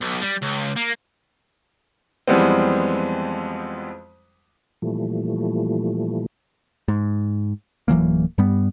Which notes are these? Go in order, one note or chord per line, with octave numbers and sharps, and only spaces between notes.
B1
G3
C#2
A#3
F2 E3 G3 G#3 B3 C4
A#2 E3 F3 G3 A3
G#2
D1 E3 F#3 A#3
G2 G3 B3